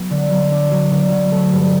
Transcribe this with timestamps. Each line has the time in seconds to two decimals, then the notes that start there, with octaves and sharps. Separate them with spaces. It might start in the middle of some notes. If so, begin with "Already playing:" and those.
Already playing: F#3 B3
0.10 D3
0.31 F#3
0.51 D4
0.71 F#3
0.91 D3
1.12 F#3
1.32 A3
1.53 G2